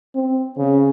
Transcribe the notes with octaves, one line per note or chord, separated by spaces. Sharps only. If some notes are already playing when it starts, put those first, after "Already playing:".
C4
C#3